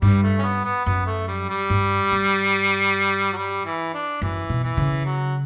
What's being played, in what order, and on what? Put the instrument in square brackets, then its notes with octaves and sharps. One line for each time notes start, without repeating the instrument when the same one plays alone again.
[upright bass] G2 [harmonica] G3
[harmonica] A3
C#4
B3
B3
[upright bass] F#2 [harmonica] B3
[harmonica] A3
G3
G3
[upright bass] G2
G2
[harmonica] F#3
G3
E3
D4
[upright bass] F#2 [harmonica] E3
[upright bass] B2
[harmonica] E3
[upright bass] C#3
[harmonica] F#3